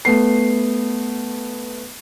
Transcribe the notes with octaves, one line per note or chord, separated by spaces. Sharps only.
A3 B3 C7